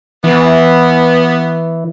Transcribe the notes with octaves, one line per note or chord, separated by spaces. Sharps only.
E3 B3